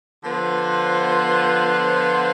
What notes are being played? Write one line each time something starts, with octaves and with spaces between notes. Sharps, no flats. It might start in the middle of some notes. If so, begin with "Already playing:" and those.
D3 F3 B3 F4 C5